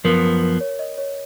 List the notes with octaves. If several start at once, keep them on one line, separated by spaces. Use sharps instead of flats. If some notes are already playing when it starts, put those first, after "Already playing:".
F#2 F3 B3 A#4
A#4
A#4
C#5
D#5
C#5